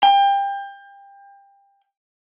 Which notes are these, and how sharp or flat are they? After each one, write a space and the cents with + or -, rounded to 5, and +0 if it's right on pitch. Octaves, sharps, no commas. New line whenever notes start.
G5 +25